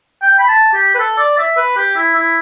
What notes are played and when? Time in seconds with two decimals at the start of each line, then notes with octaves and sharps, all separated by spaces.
0.22 G5
0.39 B5
0.48 A5
0.74 G4
0.94 B4
0.99 A4
1.19 D5
1.38 E5
1.57 B4
1.77 G4
1.96 E4
2.15 E4